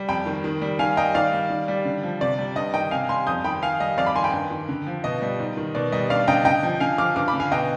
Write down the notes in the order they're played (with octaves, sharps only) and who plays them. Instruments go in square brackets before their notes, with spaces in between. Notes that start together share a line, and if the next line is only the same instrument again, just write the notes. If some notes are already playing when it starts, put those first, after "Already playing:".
Already playing: [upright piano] G3
F2 G5 B5
D#3
D#3
G3
D#3 F5 G#5
G3 D#5 G5
D#3 D5 F5
G3
D#3
G3
D3
F3
C3 D5
G3
G2 D#5
D#3 D#5 G5
C3 F5 G#5
G3 G#5 C6
F2 D#6 G6
D#3 G5 B5
D#3 F5 G#5
G3 D#5
F2 D5 F5
B5 D6
D#3 G#5 C6
G5 B5
G2
D#3
D3
F3
B2 D#5
G3
G#2
D#3
B2 D5
G3 D#5
G2 D5 F5
D3 D#5 G5
D3 D#5 G5
F3
D3 F5 G#5
F3 D6 F6
G2 D6 F6
B5 D6
D3
F5 G#5
B2 D#5 G5